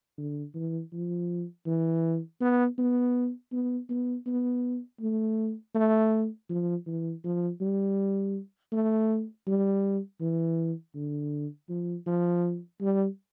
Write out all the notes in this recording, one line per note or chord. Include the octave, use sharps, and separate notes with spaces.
D3
E3
F3
E3
B3
B3
B3
B3
B3
A3
A3
F3
E3
F3
G3
A3
G3
E3
D3
F3
F3
G3